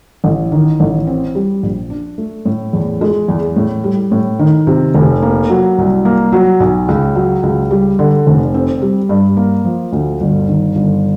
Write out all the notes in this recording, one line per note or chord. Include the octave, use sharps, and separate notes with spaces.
A1
D#3
A1
C4
G3
A#1
D4
A3
A2
E2
G#3
E2
A2
G3
A2
D#3
C3
F1
A#3
F#3
C2
A#3
F#3
B1
C#2
F#3
C#2
G3
D3
F1
C4
G3
G2
A#3
F3
D2
G1
D#3
G1